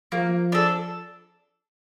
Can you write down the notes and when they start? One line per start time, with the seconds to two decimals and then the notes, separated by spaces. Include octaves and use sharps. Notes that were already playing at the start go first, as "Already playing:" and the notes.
0.12 F3 A#3
0.52 D4 A4